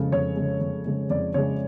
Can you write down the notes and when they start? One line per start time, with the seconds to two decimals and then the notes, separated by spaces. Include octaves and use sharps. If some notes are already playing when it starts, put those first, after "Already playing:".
Already playing: F2 C#3 G#3 A4
0.12 F2 C#5
0.36 C#3 G#3
0.61 F2
0.85 C#3 G#3
1.10 F2 D5
1.34 C#3 G#3 C#5